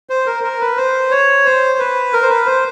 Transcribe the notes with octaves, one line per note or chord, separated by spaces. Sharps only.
C5
A#4
A#4
B4
C5
C#5
C5
B4
A#4
C5
B4
C5